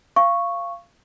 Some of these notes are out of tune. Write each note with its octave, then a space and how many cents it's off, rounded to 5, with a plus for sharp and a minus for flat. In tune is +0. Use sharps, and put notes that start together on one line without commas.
F5 -20 C#6 +0